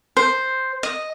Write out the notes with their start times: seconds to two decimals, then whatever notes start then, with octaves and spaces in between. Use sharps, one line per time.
0.17 C5
0.83 D#5